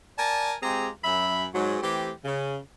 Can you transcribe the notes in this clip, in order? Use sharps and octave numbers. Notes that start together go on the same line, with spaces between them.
A#4 D5 G#5 A5
G#3 C4 F4 G4 G#4 A#5
F#2 E5 B5
G#2 F#3
E3 A3 C4 G4
C#3